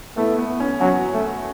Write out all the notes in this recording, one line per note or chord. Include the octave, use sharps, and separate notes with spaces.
A3 B3 E4
B3
C#4
F#3 C#4 F#4
A3